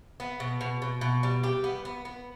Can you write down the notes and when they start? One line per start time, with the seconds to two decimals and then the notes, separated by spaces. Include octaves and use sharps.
0.20 B3
0.40 B2
0.61 B2
0.82 B2
1.01 B2
1.23 G3
1.43 G4
1.64 B3
1.85 B3
2.05 B3